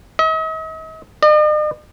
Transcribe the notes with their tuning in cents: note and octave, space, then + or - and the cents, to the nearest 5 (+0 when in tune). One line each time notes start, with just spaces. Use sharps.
D#5 +45
D#5 -45